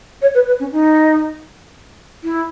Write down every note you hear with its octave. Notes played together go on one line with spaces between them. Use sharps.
C#5
B4
B4
C#4
D#4
E4